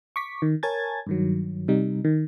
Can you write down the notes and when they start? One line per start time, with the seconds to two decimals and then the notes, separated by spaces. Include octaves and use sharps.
0.16 C#6 D6 B6
0.42 D#3
0.63 A#4 C#5 G#5 A5 G#6 A6
1.07 G2 D#3 F#3
1.68 C3 G3 D#4
2.05 D#3